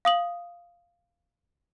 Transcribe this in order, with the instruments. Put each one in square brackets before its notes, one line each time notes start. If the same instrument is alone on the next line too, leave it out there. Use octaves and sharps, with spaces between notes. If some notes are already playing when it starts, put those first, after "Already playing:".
[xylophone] F5 D#6 F#7